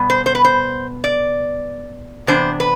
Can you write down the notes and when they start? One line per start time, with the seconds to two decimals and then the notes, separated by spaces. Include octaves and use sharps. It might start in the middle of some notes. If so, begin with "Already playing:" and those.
Already playing: B2 G3 B3
0.10 C5
0.26 C5
0.35 B4
0.45 C5
1.04 D5
2.27 C3 E3 B3 D4 C5
2.60 B4